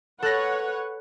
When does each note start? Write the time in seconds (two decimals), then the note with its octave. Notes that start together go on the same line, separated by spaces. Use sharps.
0.23 A4 B4 C#5 F#5 F#6 A#6